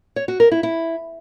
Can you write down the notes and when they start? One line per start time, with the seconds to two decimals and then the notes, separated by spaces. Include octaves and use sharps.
0.16 C#5
0.28 F#4
0.40 A#4
0.52 E4
0.63 E4